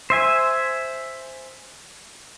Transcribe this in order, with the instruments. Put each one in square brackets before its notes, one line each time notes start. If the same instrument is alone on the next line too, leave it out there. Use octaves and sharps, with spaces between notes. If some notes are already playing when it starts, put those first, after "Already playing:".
[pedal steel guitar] C5 E5 G#5